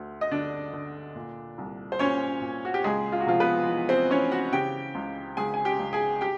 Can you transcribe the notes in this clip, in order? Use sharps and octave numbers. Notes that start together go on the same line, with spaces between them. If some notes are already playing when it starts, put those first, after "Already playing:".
Already playing: D2 D3
D#5
D3 D4 D5
D3
A#2
C2
C5
A#2 C#4 C#5
A#2
F#4
G4
C#2 G#3 G#4
F4
F#4
C3 F3 F4
B3 B4
E3
C4 C5
E3 C#4 C#5
F#4 F#5
C#3 G4 G5
C#2
C#2 G#4 G#5
G#5
G4 G5
C#2
G#4 G#5
G4 G5